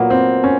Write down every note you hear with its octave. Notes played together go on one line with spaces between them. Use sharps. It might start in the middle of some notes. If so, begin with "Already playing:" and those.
Already playing: A#2 F#3 A#3 B3
C4
C#4